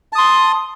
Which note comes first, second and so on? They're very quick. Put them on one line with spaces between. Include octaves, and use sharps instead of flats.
A5 D#6 C6